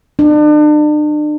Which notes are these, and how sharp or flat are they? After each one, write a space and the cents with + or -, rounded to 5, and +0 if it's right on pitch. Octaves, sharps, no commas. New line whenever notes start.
D4 +40